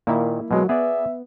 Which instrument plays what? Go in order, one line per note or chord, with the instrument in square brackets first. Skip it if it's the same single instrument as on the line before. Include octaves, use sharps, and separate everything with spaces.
[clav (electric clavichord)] A#2 D#3 [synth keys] A#3 E4
[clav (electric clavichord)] B2 G#3 [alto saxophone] F#3
[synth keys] B3 [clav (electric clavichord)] G#4 D5 [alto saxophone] E5